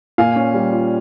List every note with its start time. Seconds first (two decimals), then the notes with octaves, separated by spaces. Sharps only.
0.18 A#2 F5 G#5
0.36 C#4
0.54 G3
0.73 F4